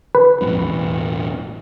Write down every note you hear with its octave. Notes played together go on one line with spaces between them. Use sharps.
B4
A#1 F2 G#2
E1 A1